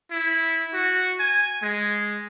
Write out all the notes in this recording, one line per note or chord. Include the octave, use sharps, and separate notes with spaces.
E4
F#4
G#5
G#3